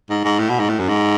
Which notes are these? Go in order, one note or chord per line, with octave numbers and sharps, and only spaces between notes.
G#2
G#2
A2
B2
G#2
A2
F#2
G#2